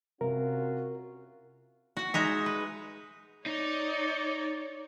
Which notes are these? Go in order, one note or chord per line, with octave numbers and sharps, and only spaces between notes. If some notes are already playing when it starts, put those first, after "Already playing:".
C3 C#4 F4 F#4 A#4
F#4 F#5
G#3 D#4 E5
B4
D#4 C#5 D5